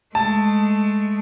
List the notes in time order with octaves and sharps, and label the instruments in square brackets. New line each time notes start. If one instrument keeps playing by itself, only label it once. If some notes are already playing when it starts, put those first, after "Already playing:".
[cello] G#3 A3 [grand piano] A5